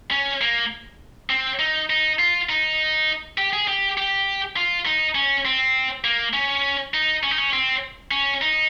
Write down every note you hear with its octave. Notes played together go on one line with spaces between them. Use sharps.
C#4
A#3
C4
D#4
D#4
F4
D#4
G4
G#4
G4
G4
F4
D#4
C#4
C4
A#3
C#4
D#4
C#4
D#4
C#4
C4
C#4
D#4